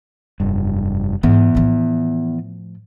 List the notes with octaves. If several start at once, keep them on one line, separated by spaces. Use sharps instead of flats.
F1 G2
G#2 E3 B3
A2 F3